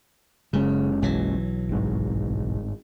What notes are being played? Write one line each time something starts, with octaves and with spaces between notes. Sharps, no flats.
F#1 C#3 G#3 C#4
B1 E3 F#3
G1 G#2